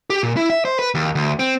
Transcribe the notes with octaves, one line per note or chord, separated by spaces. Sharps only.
G4
A#2
E4
E5
C5
B4
D#2
D2
C4